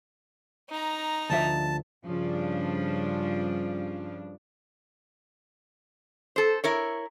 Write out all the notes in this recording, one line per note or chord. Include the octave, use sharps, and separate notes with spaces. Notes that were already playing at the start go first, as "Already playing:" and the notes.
D#4 A#5
D2 F3 E5 A5
G2 C#3 F3 D4
A4 C5
E4 A#4 C#5